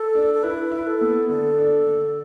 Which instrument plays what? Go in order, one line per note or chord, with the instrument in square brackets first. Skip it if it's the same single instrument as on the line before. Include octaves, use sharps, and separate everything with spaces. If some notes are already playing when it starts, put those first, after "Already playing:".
Already playing: [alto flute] A4
[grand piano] D4
[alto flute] A4
[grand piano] E4 [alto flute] B4
[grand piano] E4
[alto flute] A4
[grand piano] B3
[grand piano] D3 [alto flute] A4
[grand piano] D4
D3